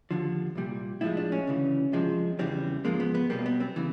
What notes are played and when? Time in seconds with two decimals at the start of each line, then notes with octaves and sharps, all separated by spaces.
0.11 D#2 D3 F3
0.55 C2 A#2 G3
1.01 A2 F3 G#3 E4
1.17 D4
1.32 C#4
1.47 D2 C#3 E3
1.93 C2 C3 F3 G#3
2.39 E2 C#3 E3 G3 C4
2.85 G#2 F3 G#3 A#3
3.00 B3
3.15 B3
3.30 B1 B2 G3 A#3
3.46 B3
3.60 C4
3.76 C#3 E3